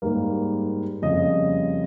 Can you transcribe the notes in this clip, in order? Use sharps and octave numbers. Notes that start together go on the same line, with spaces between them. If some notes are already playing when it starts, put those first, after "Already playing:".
G#2 G3 A#3
F2 C#3 G3 A#3 D#5